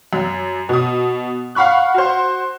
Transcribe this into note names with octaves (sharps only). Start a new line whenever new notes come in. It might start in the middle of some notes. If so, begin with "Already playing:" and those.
F#2
B2 D#6
F5 F#5 B5 C#6 F#6
F#4 C5